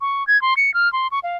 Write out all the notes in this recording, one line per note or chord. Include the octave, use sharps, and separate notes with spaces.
C#6
G#6
C6
C#7
F6
C6
C#6
F5